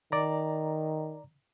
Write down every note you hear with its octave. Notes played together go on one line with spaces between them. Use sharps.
D#3 D5 A#5